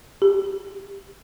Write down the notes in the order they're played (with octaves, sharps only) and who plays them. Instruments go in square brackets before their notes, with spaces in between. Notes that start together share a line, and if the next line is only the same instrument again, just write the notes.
[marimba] G4